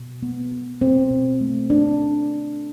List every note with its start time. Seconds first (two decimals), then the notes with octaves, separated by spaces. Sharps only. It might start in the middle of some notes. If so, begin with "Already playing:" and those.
Already playing: B2
0.23 B3
0.52 B3
0.81 B2 C4
1.11 B2
1.41 A3
1.70 C4 D4